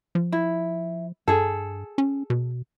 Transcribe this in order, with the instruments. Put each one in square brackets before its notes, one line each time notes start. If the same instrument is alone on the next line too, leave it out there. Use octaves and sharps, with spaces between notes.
[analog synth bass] F3
[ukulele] E4
[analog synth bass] G2 [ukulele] G#4 A4
[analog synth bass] C#4
B2